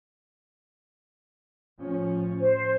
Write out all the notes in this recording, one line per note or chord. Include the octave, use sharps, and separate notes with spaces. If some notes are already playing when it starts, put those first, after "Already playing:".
A2 F3 C#4
C5